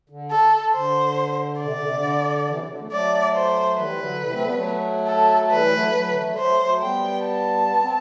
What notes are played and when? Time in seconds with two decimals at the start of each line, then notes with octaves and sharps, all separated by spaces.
0.10 D3
0.31 A4
0.74 D3 C5
1.61 C3 D5
1.73 D3
1.83 C3
1.94 D3
2.48 C3 E3
2.58 D3 F#3
2.69 D3 F#3
2.80 F#3 A3
2.91 F#3 A3 D5
3.35 C5
3.78 E3 G3 B4
3.89 E3
3.99 D3 F#3
4.21 C3 E3
4.32 A3 C4
4.43 G3 B3
4.54 F#3 A3
5.07 A4
5.51 E3 G3 B4
5.66 G3
5.73 F#3 A3
5.94 F#3 A3
6.10 D3
6.17 E3
6.23 F#3
6.30 G3
6.37 F#3 A3 C5
6.60 F#3 A3
6.81 G3 B3 G5
7.24 A5
7.68 B3
7.81 C4